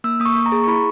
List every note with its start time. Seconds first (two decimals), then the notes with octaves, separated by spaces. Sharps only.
0.04 A#3 E6
0.20 A#3 D#6
0.25 C#6
0.35 A#3
0.46 A#5
0.52 G#4
0.63 C#6
0.67 E4 B5